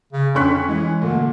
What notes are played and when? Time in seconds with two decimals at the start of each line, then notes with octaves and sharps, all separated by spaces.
0.13 C#3
0.35 F2 D3 C#4 C#6 F#6 B6
0.68 E3 G#3
1.02 A#2 D3 A3